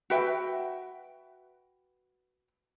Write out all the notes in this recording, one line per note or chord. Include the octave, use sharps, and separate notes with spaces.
F#4 B4 E5 G5